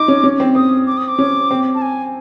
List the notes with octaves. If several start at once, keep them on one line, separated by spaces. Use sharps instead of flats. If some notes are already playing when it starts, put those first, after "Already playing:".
Already playing: D#4 D6
C#4
C#4
C4
C4 D#6
D6
D#6
D6
C#4
C4
A5
G#5